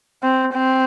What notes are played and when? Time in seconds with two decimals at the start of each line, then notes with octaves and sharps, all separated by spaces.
0.23 C4
0.54 C4